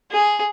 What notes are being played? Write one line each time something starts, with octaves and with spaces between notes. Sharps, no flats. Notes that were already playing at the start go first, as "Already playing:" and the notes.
G#4